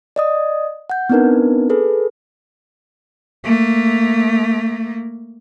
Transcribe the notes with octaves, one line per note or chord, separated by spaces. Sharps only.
D5 D#5 D#6
F#5 G6
B3 C4 D4 D#4 A#4 B4
G#4 A4 B4
A3 A#3